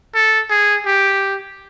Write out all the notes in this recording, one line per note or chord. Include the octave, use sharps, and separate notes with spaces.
A4
G#4
G4